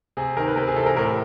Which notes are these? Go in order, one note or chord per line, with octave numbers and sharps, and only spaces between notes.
C3 G#4
D#3 A#4
B4
C3 A#4
G#4
E3 A4
A#4
A2 A#4